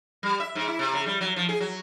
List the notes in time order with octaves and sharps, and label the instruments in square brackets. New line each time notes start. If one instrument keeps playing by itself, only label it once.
[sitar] G3
E5
G#2
E4
C3
C#3
G3
F#3
F3
G#4
F#3